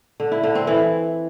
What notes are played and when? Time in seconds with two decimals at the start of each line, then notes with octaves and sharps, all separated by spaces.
0.20 D3
0.32 E4
0.43 D3
0.55 C4
0.67 E3